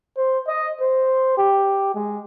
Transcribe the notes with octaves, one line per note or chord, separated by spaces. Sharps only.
C5
D#5
C5
G4
G#3